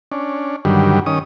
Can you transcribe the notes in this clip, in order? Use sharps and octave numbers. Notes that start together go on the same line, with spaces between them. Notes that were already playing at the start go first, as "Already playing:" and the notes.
C#4 D4
G2 D3 D#3 F#3 G3
D#3 C#4 D#6